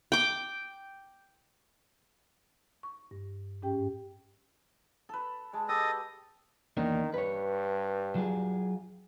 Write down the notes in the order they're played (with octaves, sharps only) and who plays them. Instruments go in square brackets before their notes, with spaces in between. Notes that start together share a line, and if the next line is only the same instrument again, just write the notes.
[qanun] G5 D6
[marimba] C#6
G2
G#2 C#4 G4 G5
[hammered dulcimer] A4 B4
[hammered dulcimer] G#3 [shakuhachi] A5
[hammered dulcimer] G4 [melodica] A4 D#5 D#6
[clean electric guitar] E2 A#3 D4 [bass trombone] D#3
[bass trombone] G2 [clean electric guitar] B4 C#5
[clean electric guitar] F#3 F4 G#4